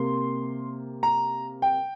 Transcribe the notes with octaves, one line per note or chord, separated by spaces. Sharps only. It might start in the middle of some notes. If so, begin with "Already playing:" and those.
Already playing: C3 A#3 C6
A#5
G5